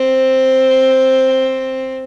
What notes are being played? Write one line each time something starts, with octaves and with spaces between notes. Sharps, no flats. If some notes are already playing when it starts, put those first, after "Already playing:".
Already playing: C4